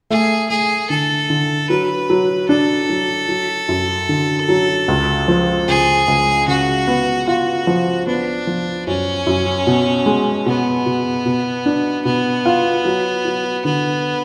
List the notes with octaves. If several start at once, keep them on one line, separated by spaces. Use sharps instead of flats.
A3 G#4
A3 G#4
D3 A4
D3
F#3 B4
F#3
D4 A4
F#3
F#3
F#2
D3
F#3
C#2
F3
C#2 G#4
C#2
C#3 F#4
B3
F4 F#4
F3
B3 D4
F3
F#2 C#4
F#2
B2
G#3
B2 B3
B2
B2
D4
B2 B3
F4
F#3
F#3
D3 B3